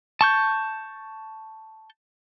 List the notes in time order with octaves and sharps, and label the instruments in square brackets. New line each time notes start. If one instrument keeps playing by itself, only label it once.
[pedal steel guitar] A5 C#6 G6